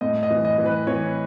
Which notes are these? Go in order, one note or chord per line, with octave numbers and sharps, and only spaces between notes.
A2 D#5
D#5
E3
D#5
E3
B4
E3 C#5